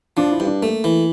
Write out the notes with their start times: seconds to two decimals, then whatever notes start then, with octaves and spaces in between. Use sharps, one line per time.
0.17 F3 D4
0.32 E4
0.40 G2
0.47 D4
0.62 A3 A#3
0.84 E3